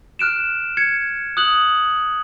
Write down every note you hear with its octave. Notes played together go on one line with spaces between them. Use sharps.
F6 F#6 D7 E7
G#6 C#7
D#6 F#6 F#7